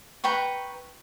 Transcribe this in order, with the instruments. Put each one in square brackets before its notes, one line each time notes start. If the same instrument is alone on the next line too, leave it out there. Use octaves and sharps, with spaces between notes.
[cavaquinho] B4 G5 A#5 C#6